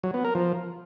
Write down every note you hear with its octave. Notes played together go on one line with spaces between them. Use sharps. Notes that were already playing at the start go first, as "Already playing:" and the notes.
F#3
B3
A#4
F3